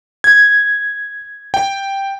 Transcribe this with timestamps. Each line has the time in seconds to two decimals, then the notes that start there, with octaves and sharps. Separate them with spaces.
0.24 G#6
1.54 G5